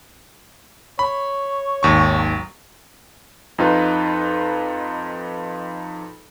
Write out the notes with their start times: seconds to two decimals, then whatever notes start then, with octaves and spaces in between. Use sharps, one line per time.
0.99 C#5 B5
1.83 G#1 D#2 C#6
2.18 F#3
3.58 F2 D#4 F4 B4